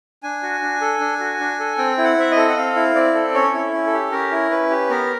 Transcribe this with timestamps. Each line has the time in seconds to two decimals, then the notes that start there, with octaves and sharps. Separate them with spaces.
0.23 D4 G#5
0.43 F#4
0.62 D4
0.81 A4
1.00 D4
1.20 F#4
1.40 D4
1.60 A4
1.78 C4 G5
1.98 E4
2.05 F#5
2.17 C4 E5
2.31 D#5
2.36 A4
2.50 F#5
2.57 C4 F5
2.76 E4
2.95 C4 D5
3.14 A4
3.34 C#4 C#5
3.54 E4
3.73 C#4
3.87 A4
3.93 G4
4.12 C#4 A#4
4.31 E4
4.51 C#4 B4
4.70 G4
4.90 B3 A#4